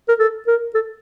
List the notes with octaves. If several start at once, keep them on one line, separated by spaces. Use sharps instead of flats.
A#4
A4
A#4
A4